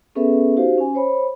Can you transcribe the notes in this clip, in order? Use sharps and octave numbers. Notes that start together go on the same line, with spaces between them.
B3 C#4 G#4 A4 B4 E5
D#4 F#4 G4 C5 F5
C#4 G#5
C5 C#5 B5